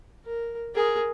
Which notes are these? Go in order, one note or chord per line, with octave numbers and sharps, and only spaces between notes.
A#4
G#4 A#4